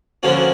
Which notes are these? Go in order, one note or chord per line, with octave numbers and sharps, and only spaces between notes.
D3 F3 A#3 C#4 F#4